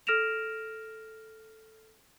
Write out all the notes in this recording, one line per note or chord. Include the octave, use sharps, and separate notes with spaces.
A4 F6 A#6 D7 E7 F7